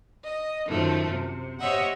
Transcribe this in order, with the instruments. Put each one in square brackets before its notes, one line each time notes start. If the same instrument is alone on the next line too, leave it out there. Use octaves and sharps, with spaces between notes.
[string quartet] D#5
F#2 D#3 F3 A3
C3
G4 C5 C#5 D#5 E5 F#5